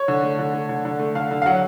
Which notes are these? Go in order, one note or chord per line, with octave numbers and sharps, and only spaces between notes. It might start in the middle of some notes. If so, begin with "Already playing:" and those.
Already playing: C#5
D3
A3
D3
A3
D3
D3
A3
D3 F5
D3
F5
F#3 F#5